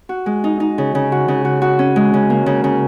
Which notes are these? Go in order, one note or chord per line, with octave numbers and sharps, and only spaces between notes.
F#4
G#3
D#4
D#4
C#3
C#3
F#4
C#3
F#4
F#4
C#4
G#3
C#3
A#3
C#3
C#3